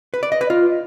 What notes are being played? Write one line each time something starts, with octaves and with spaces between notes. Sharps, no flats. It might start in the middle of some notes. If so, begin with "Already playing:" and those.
B4
D5
D#5
B4
F4